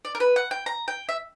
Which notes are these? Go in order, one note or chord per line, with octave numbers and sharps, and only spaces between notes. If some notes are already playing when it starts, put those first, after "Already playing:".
D5
A#4
B4
F#5
G5
A#5
G5
E5